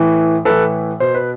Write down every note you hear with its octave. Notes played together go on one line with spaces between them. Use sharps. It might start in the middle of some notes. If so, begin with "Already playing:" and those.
Already playing: A2 E3
A2 E3 A4 B4
B2 C5
B4